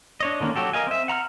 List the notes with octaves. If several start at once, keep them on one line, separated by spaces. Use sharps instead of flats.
D4 C#5 D#5
D3 D#3 A#3 C#4
F#3 F#4 G4 A4
A#4 D#5 F5 G#5
C4 E5
F#5 A#5 B5 F6